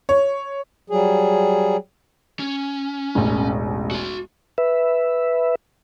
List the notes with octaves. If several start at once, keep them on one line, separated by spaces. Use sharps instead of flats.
C#5
F#3 G3 G#4
C#4
E1 A1
F#4 C6
B4 E5